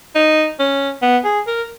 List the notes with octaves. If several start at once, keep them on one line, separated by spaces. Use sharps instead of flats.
D#4
C#4
B3
G#4
A#4